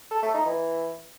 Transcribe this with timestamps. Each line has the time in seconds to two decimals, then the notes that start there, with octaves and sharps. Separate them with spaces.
0.11 A4
0.22 A3
0.34 D#4
0.46 E3